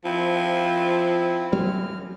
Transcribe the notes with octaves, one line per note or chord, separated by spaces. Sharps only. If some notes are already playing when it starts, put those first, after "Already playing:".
F3 C4 E4
F#2 F#3 G#3 C4 F6